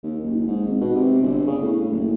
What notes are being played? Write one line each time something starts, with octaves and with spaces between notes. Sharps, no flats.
D#2
F#1
G#2
G#1
B2
C3
G1
C#3
A2
F#1